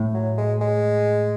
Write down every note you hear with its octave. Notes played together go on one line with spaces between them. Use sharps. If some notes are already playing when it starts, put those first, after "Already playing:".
Already playing: A2
F#3
G#3
G#3